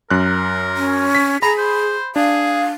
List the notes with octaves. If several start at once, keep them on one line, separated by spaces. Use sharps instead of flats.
F#2 A#4 F#6
C#4
B6
G#4 A#5 B5
C5
D4 G#4 F5